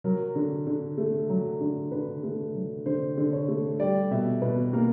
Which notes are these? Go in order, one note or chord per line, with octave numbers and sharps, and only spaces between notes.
F#3 A#4
D3
D3
A3
F#3
D3
D3 B4
A3
F#3
D3 C5
D3
C#5
A3
G3 D5
B2 E5
B2 B4
A#3 A#4